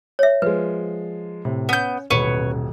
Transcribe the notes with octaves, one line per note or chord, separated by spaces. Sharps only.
C#5 E5
F3 G#3 B4
A2 C3
B3 C#4 G6
D#1 A1 B2 B4 C#5